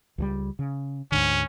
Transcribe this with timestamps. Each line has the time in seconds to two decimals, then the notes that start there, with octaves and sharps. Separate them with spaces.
0.18 C#2 F3 G3
0.59 C#3
1.12 D2 G#2 D3 C#4